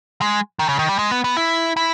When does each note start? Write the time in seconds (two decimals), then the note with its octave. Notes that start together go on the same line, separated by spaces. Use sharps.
0.21 G#3
0.59 D#3
0.69 C#3
0.79 D#3
0.89 G3
0.99 G#3
1.11 B3
1.24 B3
1.37 E4
1.77 E4